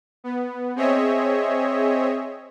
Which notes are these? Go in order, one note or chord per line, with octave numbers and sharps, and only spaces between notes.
B3
C4 G#4 C#5 D#5 E5